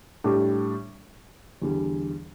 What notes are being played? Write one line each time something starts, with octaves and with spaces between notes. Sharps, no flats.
A2 G3 D4 G4
E2 D3 G3